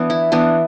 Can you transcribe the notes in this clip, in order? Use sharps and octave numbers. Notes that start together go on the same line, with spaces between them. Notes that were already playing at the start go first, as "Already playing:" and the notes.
Already playing: E3 B3 D4
E4
E3 B3 D4